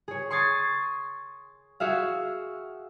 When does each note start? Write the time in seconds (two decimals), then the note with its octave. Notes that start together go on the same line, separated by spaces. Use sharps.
0.08 G#4 C#5
0.30 C6 C#6 D#6 G#6 A6 C7
1.80 F#4 G#4 E5 F5